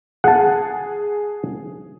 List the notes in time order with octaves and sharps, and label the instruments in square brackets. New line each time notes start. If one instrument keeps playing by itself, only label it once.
[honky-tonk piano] G#4 [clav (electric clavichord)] F#5 A5